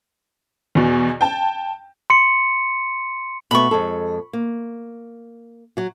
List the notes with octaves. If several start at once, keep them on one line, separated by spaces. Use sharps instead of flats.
E2 B2
G5 A5
C6 C#7
B2 A3 B3 B5 C#6
F2 G#3 A4
A#3
F#3 F#4